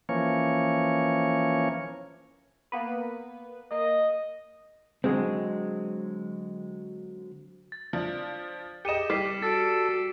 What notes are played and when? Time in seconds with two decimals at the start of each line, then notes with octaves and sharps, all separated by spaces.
0.09 E3 F3 A#3 C#4 C#5
2.72 A#3 B3 B4
3.71 A#3 D#5
5.04 D3 F#3 G#3 C4
7.72 A6
7.93 F3 D4
8.85 G4 G#4 D#5 C#7 D#7 E7
9.10 G3 D6 B6 C7
9.42 F#4 A4 A6 D7